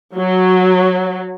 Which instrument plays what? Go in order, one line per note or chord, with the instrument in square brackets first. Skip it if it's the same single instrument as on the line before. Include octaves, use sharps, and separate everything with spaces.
[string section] F#3